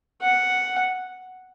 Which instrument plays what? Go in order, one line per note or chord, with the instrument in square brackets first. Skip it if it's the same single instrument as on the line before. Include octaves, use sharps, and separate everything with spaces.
[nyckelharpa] F#5